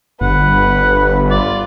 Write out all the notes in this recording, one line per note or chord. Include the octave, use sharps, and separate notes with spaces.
G1 B4 F#5
F4 D5